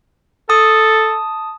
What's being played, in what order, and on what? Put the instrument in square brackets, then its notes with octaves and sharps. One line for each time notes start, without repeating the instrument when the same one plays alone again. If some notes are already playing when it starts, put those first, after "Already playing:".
[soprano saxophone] A4 [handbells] A5 D#6